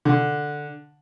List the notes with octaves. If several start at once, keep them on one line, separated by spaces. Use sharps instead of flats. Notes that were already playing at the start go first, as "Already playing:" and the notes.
D3